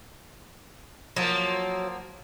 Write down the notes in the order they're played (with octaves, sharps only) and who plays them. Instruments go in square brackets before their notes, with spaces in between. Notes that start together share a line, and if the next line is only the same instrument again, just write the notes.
[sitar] F3 A#3 [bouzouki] F#3